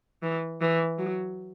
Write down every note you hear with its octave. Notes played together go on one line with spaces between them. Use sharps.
E3
E3
F#3